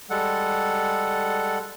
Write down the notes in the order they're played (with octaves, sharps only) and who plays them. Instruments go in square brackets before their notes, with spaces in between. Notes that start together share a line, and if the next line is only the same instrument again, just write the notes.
[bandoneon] G3 G#3 A4 F#5